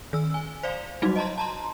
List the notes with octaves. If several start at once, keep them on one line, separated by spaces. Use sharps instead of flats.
D#3 E6
G#5
C5 D5 F5
F#3 G3 D#4 F#4
D#5 A5 A#5 C6
A5 A#5 C6